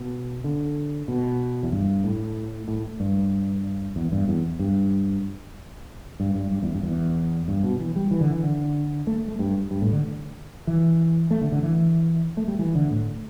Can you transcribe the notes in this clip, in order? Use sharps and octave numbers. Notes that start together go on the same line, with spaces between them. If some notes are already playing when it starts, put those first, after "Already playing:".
Already playing: B2
D3
B2
E2
G2
A2
A2
G2
E2
G2
E2
G2
G2
G2
G2
E2
G2
E2
G2
B2
E3
G3
E3
D3
E3
D3
A3
A3
G2
G2
A2
D3
E3
A3
D3
D3
E3
A3
G3
E3
D3
A2